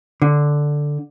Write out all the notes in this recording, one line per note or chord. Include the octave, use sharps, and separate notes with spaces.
D3